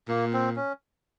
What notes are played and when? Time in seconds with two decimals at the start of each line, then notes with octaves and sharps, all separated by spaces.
0.08 A#2 A#3
0.33 C4
0.56 C#4